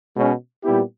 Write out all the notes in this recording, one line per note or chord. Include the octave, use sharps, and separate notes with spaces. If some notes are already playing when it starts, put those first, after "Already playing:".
B2 G#3 C#4
A#2 G3 B3 E4 G4